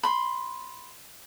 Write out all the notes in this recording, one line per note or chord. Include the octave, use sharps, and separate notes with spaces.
B5 C6